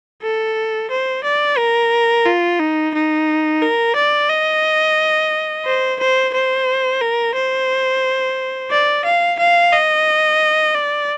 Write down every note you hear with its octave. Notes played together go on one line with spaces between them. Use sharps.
A4
C5
D5
A#4
F4
D#4
D#4
A#4
D5
D#5
C5
C5
C5
A#4
C5
D5
F5
F5
D#5
D5